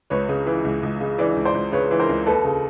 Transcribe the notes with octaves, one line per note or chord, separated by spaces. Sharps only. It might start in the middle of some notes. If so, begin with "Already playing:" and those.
C#2 B4 C#5
C#3
E3
C#2
C#2
C#3
E3 D5
C#2
C5 D5
C#2
C#3 B4 C#5
E3
A#4 C5
C#2
D#2 A4 B4
C#3